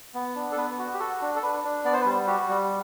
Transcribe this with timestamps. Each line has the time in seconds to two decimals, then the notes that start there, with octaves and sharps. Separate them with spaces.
0.14 B3
0.36 D4
0.52 A4
0.57 B3 B4
0.79 F#4
0.93 G4
1.00 F#4 A4
1.22 D4
1.36 A4
1.42 D4 B4
1.64 D4
1.85 B3 D5
1.93 C5
2.01 B4
2.06 G3 C5
2.27 F#4 G4
2.49 G3